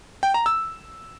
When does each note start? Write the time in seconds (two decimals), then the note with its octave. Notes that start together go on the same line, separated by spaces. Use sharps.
0.23 G5
0.34 A#5
0.46 E6